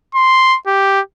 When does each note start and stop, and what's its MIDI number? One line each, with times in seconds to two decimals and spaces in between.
0.15 0.57 84
0.66 1.00 67